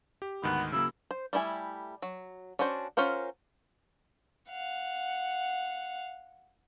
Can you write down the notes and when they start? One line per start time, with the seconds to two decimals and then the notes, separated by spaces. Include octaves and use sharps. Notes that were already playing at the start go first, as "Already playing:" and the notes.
0.22 G4
0.43 D2 G#2 D#3 B3
0.72 C#3 F#3 A#3 E4
1.11 C5
1.33 G3 A3 E4 G#5
2.02 F#3
2.59 C#4 D4 F#4 C5
2.97 C#4 F4 A#4 C5 F#5
4.49 F5 F#5